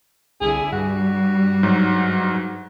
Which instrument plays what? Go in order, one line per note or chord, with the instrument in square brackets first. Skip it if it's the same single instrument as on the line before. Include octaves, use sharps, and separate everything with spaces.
[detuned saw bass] C2 [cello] D3 E4 [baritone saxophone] G#4
[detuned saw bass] G2 [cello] G3 [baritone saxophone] F#4
[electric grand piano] G#2 F#3